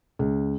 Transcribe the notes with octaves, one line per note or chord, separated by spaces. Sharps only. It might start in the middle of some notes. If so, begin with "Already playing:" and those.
C#2